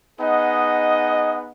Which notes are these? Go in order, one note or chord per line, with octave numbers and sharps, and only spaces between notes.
B3 D#4 G#4 D#5 F#5